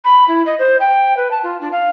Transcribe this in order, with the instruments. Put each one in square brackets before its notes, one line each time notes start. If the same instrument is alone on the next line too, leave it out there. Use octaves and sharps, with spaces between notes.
[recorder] B5
E4
D#5
C5
G5
B4
A5
F4
D4
F5